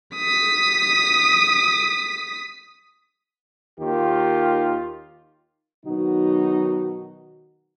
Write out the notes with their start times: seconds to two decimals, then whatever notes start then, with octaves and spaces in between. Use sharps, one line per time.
0.17 D#6 B6
3.78 D#2 D#3 F4 G4
5.86 B2 D#3 F#3 D#4 F#4